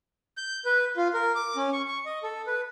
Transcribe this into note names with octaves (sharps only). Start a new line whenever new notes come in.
G6
B4
F4
A#4
D6
C#4
C#6
C#6
D#5
A4
B4